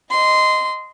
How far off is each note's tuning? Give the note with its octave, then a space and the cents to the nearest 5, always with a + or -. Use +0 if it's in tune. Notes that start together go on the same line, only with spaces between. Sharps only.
D#5 +0 C6 -15